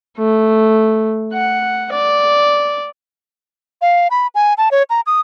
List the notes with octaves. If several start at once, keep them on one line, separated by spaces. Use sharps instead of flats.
A3
F#5
D5
F5
B5
G#5
A5
C#5
A#5
D#6